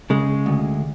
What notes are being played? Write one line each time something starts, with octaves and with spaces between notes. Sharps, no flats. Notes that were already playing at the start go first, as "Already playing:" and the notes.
C#3 G#3
D2